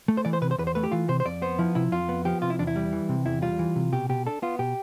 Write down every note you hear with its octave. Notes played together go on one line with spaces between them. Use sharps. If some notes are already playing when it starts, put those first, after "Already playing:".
A3
C5
E3 D5
C5
C3 B4
C5
E2 B4
C5
A3 B4
G4
E3 F4
C3 C5
C5
F2 D5
B3 C5
F3 E4
C3 E4
F2 F4
B3
F3 G4
C3 F4
E4
E2 D4
E4
G3
E3
C3
E2 E4
G3 F4
E3
C3
B2 G4
B2 G4
D4 A4
B3 F4
B2 G4